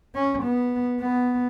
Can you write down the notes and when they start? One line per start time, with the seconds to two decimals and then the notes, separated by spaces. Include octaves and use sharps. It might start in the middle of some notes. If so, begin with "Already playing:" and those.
0.15 C#4
0.44 B3
1.01 B3